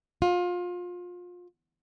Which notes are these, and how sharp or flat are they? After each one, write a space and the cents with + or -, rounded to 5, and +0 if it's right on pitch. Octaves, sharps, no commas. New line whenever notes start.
F4 +25